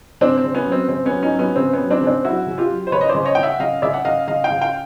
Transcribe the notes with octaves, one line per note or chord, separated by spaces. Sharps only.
C#3 C4 D4
C4
C#3
B3 C#4
F#3
C4
C#3 C4
B3 C#4
F#3
C#4 D#4
F#3
B3 C#4
C#3 C4
B3 C#4
F#3
C4 D4
C#3
C4 D4
F#3 E4 F#4
C#3
F4 G4
F#3
C5
C#3 B4 C#5
D#5
C5 D5
C#3
C#5 D#5
C#3 G5
E5 F#5
C#3 D#5 F5
C#3 D5 E5
F#5
C#3 D#5 F5
C#3 D#5 F5
F5 G5
C#3
F5 G5